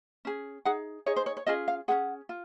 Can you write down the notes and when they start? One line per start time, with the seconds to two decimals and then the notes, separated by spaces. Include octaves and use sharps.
0.25 C#4 G#4
0.65 D#4 G#4 F#5
1.06 D#4 G#4 C#5
1.16 C5
1.26 C#5
1.37 C#5
1.46 C#4 F4 G#4 D#5
1.68 F5
1.88 C#4 F4 G#4 F#5
2.29 F4